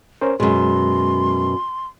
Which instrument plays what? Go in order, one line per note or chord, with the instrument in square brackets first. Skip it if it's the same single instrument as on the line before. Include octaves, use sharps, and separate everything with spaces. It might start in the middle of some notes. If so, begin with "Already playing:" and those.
[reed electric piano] C#4 A#4 C5
[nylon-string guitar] F#2 B2 [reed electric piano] G#3 [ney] C6